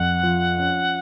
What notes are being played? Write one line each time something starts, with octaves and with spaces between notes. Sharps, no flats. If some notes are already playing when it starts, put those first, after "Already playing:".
Already playing: F2 F#5
F3
C#4